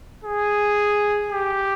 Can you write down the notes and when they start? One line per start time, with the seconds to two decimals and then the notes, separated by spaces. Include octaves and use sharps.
0.24 G#4
1.32 G4